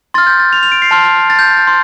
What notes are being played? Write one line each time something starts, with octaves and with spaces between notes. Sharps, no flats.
C6 F6 A6
G6
A6
F7
F7
D7
C7
A5 C6 F6
A6
G6
A6
G6
C6